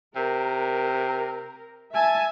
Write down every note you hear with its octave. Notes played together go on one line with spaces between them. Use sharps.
C3 A#4
E5 G#5 A5